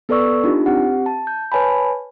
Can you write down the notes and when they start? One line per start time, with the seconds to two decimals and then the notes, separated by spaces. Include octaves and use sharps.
0.09 B3 A4 B4 D5 C#6 E6
0.44 D4 D#4 F4 G4
0.66 C4 G4 F#5
1.06 A5
1.27 G6
1.52 B4 C#5 G#5 A5 B5